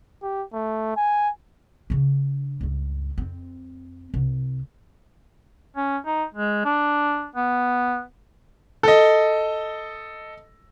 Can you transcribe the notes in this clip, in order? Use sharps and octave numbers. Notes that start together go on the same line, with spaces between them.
G4
A3
G#5
C#3 D4
C#2 G2
F2 C4
C2
C#4
D#4
G#3
D4
B3
A4 D#5